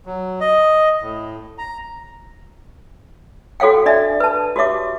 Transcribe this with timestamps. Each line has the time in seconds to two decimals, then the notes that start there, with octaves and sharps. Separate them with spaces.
0.06 F#3
0.41 D#5
1.01 A2
1.58 A#5
3.60 F#4 A4 C#5 F5 G5
3.86 D4 D5 E5
4.20 B4 A5
4.56 F#4 G4 C#5 E5 D6